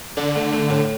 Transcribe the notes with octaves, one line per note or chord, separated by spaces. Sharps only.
D3 D4
A3
A3
A2